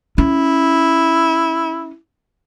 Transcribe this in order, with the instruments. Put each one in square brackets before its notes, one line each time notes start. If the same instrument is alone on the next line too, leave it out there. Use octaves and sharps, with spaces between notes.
[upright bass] C#4 [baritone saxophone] E4